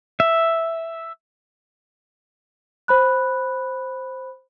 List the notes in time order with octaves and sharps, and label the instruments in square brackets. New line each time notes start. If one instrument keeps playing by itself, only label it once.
[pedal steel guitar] E5
[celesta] C5 B5 F#6